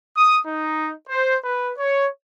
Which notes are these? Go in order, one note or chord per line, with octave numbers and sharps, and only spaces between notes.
D#6
D#4
C5
B4
C#5